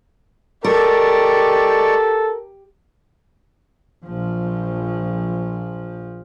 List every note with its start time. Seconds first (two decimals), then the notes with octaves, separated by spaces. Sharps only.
0.64 G#3 G4 A4 A#4 D5 C#6
4.06 A#1 F3